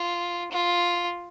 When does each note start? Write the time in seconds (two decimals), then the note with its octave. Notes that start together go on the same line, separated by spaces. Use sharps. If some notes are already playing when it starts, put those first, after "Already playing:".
Already playing: F4
0.51 F4